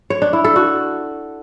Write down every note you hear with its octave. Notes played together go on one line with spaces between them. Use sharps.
C#5
D4
E4
A4
F#4